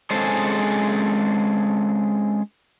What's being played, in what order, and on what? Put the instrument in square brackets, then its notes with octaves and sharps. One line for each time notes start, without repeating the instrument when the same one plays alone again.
[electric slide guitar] G#3 C4 C#4 G#4 A4 C5